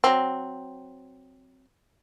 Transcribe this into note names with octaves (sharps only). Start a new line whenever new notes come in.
F#3 C4